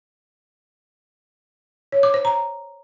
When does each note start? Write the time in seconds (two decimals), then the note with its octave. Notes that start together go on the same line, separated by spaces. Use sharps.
1.92 C#5
2.03 D6
2.14 C5
2.25 A#5